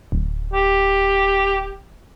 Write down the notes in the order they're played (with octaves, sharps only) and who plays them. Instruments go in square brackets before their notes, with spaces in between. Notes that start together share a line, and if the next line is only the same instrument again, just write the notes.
[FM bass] D1
[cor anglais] G4